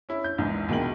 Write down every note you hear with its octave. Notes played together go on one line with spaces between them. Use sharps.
C#4 E4
G6
A#1 E2 G#2
A#1 B2 D#3 G#3 G5 F#7